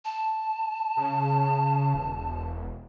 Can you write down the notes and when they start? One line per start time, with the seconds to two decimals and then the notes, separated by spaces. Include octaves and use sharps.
0.05 A5
0.97 C#3
1.95 E1